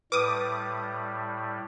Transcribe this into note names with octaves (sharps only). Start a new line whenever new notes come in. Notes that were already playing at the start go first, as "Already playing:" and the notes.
A2 G3 B4 D6 D#6